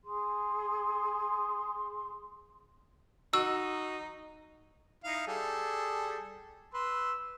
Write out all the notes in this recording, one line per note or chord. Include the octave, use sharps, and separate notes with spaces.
G#4 C6
D#4 F#4 E6
D#4 E4 F5
G3 G#4 A4
B4 C6 E6